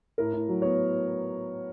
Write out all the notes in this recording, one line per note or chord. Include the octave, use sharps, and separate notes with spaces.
A2 A#4
A2
F#3
B3 C#5